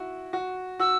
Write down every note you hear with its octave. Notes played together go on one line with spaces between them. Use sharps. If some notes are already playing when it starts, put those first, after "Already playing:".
Already playing: E4 F#4
F#4
F#4 E6